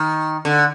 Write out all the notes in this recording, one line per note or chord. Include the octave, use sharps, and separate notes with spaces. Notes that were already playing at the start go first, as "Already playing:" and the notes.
Already playing: D#3
D3